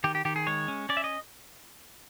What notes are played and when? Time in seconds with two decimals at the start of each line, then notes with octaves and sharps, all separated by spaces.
0.04 D#3 G4
0.15 G4
0.25 D#3 G4
0.36 G#4
0.47 G#3 C#5
0.68 C#4
0.89 C#4 D5
0.97 E5
1.04 D#5